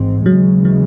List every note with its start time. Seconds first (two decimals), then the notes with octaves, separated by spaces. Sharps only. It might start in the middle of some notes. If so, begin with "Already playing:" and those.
Already playing: G#1 G#2 E3 C4
0.26 D#2 C#3 E3 F#3 G#3
0.65 F#3